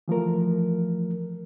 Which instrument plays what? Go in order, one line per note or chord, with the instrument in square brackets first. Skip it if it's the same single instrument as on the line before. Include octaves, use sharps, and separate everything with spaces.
[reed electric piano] E3 F3 A3 A#4